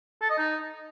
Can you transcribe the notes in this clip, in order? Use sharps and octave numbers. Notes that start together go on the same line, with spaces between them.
A4
D#5
D#4